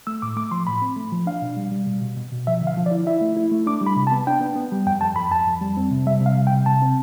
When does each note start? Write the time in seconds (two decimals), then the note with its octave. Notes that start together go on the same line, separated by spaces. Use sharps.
0.07 A3 E6
0.22 A2 D6
0.36 A3 D6
0.51 F3 C6
0.67 A2 B5
0.82 C4
0.96 A3
1.12 F3
1.26 D4 F5
1.42 B2
1.57 G3
1.72 G3
1.87 B2
2.01 B2
2.16 B2
2.32 B2
2.47 F3 E5
2.61 D3
2.67 F5
2.77 F3
2.86 D5
2.91 E4
3.07 E4 E5
3.21 A3
3.37 E4
3.52 A3
3.67 D4 D6
3.81 G3
3.87 B5
3.96 C3
4.07 A5
4.12 B3
4.27 D4 G5
4.41 B3
4.56 B3
4.72 G3
4.86 F2 G5
5.01 F2 A5
5.16 F2 B5
5.31 F2 A5
5.47 F2
5.61 G3
5.77 C4
5.91 C3
6.06 G3 E5
6.21 C3
6.26 F5
6.37 G3
6.47 G5
6.52 C3
6.66 C3 A5
6.82 C4